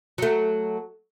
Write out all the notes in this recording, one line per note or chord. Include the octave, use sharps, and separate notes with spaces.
F#3 A3